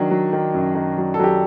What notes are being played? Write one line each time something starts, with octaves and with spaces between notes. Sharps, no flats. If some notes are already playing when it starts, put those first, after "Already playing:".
Already playing: D#3 F#3 D4
F#3
D#3
F#2
D#3
F#3
A4
F#3 G4